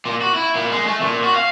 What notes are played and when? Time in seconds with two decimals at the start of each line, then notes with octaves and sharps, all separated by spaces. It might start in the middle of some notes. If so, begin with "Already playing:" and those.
0.06 A#2
0.22 F#4
0.34 E4
0.55 A#2
0.72 G#3
0.87 A3
1.01 A#2
1.24 F#4
1.36 F5